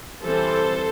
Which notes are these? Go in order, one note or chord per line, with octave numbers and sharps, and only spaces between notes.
E3 G3 C4 A4 C5